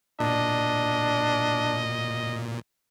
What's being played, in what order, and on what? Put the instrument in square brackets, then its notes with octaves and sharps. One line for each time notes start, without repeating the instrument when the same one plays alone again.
[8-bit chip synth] A#2 [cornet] D4 [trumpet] D#5